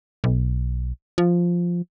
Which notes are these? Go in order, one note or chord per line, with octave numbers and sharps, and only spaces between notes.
B1
F3